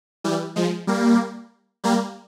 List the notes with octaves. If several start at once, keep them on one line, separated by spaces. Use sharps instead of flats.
E3 G3
F3 G#3
G3 A#3
G3 A#3